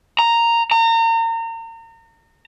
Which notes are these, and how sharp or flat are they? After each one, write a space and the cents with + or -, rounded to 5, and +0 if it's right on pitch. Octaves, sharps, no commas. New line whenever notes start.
A#5 -5
A#5 -35